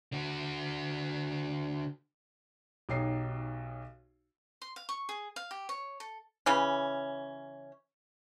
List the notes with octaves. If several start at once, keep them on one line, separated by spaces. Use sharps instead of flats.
D3 F#4
B1 B2 D#4 G4 C#5 C7
C6
F5
C#6
G#4
F5
G4
C#5
A4
C#3 E3 C#4